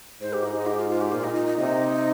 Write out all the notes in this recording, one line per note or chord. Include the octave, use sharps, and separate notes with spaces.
G#2 C5
G4
D#4
D#4
G4
F4
F4
G4
A#2 F4
D#4
D#4
D#4
C3 D#4